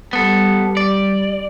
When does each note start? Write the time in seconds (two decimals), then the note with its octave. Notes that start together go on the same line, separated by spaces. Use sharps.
0.13 G3 B3 A4
0.77 D5